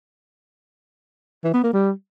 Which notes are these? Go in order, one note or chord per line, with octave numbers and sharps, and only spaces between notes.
E3
B3
A#3
G3